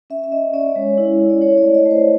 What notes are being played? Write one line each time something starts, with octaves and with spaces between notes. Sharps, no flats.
C#4 E5
E5
C#4 D#5
C#4 D5
G#3 C#5
E4
E4
D5
E4 C#5
D5
A3
D#5
A3
C5